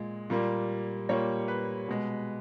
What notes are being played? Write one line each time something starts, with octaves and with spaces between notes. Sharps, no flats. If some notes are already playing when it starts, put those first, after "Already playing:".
Already playing: A#2 G#3
A#2 G3 A#3
A#2 G3 A#3 C#5
B4
B2 G#3